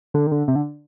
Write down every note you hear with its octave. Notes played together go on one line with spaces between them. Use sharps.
D3
D#3
D3
C3
D3